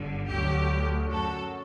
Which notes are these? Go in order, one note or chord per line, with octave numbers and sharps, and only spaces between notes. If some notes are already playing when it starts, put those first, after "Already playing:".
Already playing: G1 G2 D3
D2 D3 F#3 G4
F#2 F#3 F#4 A4